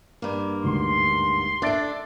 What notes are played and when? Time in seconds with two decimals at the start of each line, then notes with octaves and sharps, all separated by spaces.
0.22 G2 A#3
0.64 D2 G#2 C6
1.62 D4 A4 E5 A6 D7